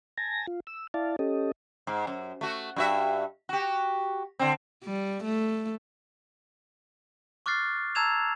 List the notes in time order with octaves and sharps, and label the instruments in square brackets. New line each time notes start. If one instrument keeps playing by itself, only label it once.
[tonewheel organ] G#5 A5 A#6
F4
E6
E4 D5 F5 A5
C#4 G4 A4 D#5
[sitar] G#2
F#2
A3 F#4
G2 F#4 E5
F#4 G4
D3 C4
[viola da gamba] G3
A3
[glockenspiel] C#6 D6 F6 F#6 A6 C7
A5 A#5 E6 G#6 E7 F7